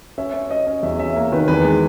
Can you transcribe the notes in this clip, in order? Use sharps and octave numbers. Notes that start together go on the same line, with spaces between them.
C#4 E5
C#4
C#4 D#5
C#4
E2 E5
C#4 E5
A#3
D#3 B4
E2 B4
G#3